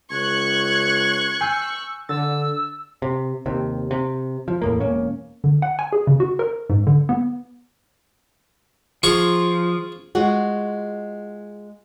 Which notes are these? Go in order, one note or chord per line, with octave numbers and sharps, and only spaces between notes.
C#2 C#6 F#6 G#6
G#5 E6 G6 C7
D3 E6 A6
C3
D#2 C3
C3
F3
E2 A2 A#3
E1 A#3 C#4
D3
F#5
G#5
G#4
C#3
F#4
A#4
G#2
D3
B3
F3 F4 G#4 C#6
G#3 F4 F#4 G#4